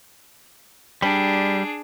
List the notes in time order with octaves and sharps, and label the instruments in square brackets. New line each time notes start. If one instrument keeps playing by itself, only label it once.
[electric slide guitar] G3 [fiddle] D4 G#4